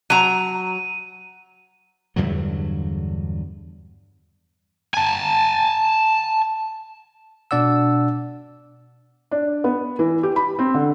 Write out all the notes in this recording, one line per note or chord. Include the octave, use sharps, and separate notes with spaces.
F#3 A#5 D#7
E2 G2 D3 F#3
G#5 A5
B2 D4 D5 F#5 E6
D4
B3
E3
G4
B5
C4
D3